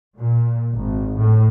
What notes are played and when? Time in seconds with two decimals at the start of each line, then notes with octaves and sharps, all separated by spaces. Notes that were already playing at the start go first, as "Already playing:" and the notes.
0.18 A#2
0.71 G#1
1.17 A2